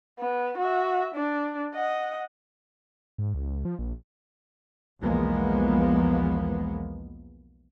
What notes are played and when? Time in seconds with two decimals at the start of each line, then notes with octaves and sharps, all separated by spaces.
0.19 B3
0.58 F#4 E5
1.15 D4
1.74 D#5 F#5
3.18 G#2
3.34 C#2
3.65 F3
3.79 A#1
5.02 B1 E2 F3 G#3 A#3 B3